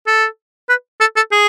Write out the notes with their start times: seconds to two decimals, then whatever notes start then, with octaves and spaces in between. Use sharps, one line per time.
0.07 A4
0.70 B4
1.01 A4
1.16 A4
1.32 G#4